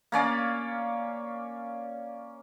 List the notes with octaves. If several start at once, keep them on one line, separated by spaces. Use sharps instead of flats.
A#3 C#4 D5 F5